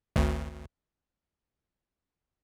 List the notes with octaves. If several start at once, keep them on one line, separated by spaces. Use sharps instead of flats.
G#1 D2